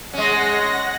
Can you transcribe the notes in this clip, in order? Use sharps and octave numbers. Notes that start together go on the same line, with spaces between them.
G#3 C#4 F#5 A#6